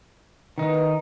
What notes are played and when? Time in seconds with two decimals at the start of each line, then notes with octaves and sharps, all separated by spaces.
0.58 D#3 E3 B3 D#4 B4
0.74 A#3